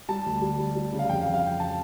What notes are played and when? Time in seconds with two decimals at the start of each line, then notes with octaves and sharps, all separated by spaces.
0.09 G3 A5
0.26 D2
0.42 G3
0.58 G3
0.75 G3
0.92 C#3
0.99 F5
1.09 F2 G5
1.21 F5
1.27 F2
1.34 F5
1.43 F2 G5
1.60 A5